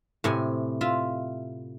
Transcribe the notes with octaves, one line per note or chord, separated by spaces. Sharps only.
A2 C3 G#5
F4 E5